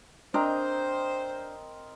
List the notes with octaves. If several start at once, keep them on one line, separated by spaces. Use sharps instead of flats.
C4 D4 A#4 C5 D#5 A#5